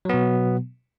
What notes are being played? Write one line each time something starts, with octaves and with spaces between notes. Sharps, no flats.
B2 F#3 B3